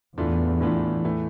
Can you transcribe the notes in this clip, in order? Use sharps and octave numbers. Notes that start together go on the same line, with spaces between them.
E2 A2 E3 A3 D4 F4
A2 E3 A3 D4 F4
A2 E3 A3